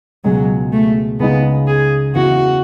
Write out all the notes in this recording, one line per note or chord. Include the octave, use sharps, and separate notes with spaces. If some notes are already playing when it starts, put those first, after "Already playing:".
C#2 B2 F#3 G#3
A3
C#2 C#3 G#3 B3 D#4
G#4
E2 C#3 E3 F#4